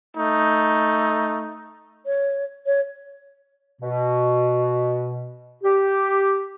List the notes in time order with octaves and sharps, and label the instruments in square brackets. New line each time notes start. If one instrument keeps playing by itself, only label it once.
[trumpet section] A3 D#4
[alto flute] C#5
C#5
[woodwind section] B2
G4